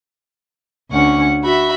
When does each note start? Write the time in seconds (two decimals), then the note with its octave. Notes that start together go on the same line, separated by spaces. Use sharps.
0.91 D2 C#4 F#5 C#6
1.41 F#4 E5 B5